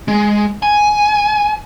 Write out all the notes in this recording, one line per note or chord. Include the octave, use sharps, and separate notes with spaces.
G#3
G#5